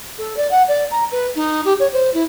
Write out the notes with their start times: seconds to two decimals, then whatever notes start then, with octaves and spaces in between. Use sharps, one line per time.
0.18 A4
0.37 D5
0.51 F#5
0.68 D5
0.91 A#5
1.12 B4
1.35 D#4
1.65 G4
1.79 C#5
1.93 C5
2.14 E4